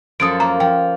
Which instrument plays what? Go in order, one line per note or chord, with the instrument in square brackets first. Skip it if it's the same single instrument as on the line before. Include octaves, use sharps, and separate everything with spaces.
[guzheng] F#2 F3 A4 [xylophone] D#6 D7
[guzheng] A#3 [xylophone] A#5
[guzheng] F3 [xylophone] G5